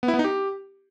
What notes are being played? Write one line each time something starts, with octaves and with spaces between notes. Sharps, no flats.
B3
E4
B3
D#4
G4